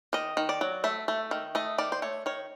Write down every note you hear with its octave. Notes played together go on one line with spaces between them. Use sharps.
D#3 D#5
D#3
D5
F#3
A3 E5
A3
D#3
A3 D#5
D#3 D5
C5
A3 C#5
D#3 C#5